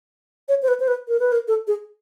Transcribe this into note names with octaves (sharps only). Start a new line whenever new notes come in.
C#5
C5
B4
C5
B4
A#4
B4
A#4
A4
G#4